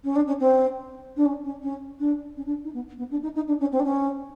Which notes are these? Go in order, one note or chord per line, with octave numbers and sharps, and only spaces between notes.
C#4
D4
C#4
C4
D4
C#4
C#4
C#4
D4
C#4
D4
D#4
B3
B3
D4
D#4
D#4
D4
C#4
C4
D4
C#4